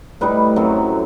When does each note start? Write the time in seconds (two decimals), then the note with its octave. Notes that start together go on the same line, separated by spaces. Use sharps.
0.21 A2 G3 D#4 B4
0.56 F#2 F#3 A3 C4